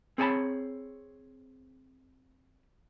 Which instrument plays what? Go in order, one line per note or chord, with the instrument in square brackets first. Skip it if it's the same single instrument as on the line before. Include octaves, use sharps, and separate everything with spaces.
[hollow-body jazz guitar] C4 G#4 C#5 G#5 A5 B5